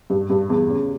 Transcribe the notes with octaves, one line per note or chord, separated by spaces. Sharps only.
G2
G2
E2
C#3